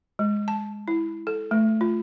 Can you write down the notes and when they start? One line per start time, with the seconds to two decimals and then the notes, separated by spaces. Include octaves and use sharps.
0.19 G#3
0.48 A5
0.88 E4
1.27 A4
1.51 A3
1.81 F4